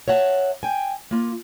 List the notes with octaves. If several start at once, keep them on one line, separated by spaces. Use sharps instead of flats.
C#5 E5 F#5 A5
G5 G#5
A#3 F4